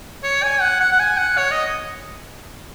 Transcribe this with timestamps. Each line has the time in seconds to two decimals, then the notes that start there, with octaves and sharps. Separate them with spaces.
0.23 C#5
0.43 G#5
0.61 F#5
0.80 F#5
0.92 F#5
0.99 G#5
1.17 F#5
1.37 C#5
1.51 D#5